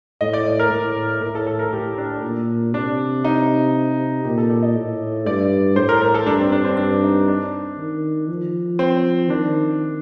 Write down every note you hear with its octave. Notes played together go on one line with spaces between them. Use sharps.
A2 D#5
D5
A#4
A2
A2 A#4
A4
A4
A#4
A2 G4
D4
A#2
C3 D4
D#4
A#2 G4
A4
D5
D#5
A2
G2 D5
A2 C5
A#4
A#4
A4
G2 D4
C4
D4
C4
G2 D4
D#4
D4
D#3
F3
C4
D#3 D4